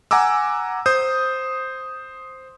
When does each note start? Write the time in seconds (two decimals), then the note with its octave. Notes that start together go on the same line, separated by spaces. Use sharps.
0.11 F#5 G#5 A#5 D6 E6
0.86 C5 D#6 G6